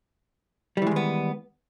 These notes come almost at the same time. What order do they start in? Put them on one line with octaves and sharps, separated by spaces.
G3 E3 G#3 D#3 B3